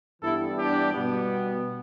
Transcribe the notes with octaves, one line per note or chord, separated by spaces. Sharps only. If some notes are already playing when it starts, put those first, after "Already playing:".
G2 E3 G3 B3 E4 A4
D4 G4
B2 G3 B3